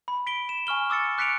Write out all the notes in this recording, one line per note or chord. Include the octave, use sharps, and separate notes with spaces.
B5
B6 D7 G7
E7
G#5 C#6 F6 G7
D6 E6 A6 C#7
D6 F#6 B6 C#7 D7 F7